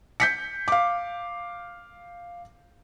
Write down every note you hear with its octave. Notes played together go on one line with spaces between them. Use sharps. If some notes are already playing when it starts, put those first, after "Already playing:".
G6 B6 C#7
F5 D6